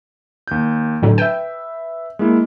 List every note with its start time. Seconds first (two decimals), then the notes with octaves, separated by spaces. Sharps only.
0.47 D#2 G6
1.02 A2 D3 F#3
1.18 B4 E5 G5
2.19 G#3 A#3 E4